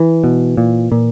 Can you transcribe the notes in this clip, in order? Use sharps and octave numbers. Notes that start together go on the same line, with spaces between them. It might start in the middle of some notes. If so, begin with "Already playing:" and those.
Already playing: E3
B2
A#2
A#2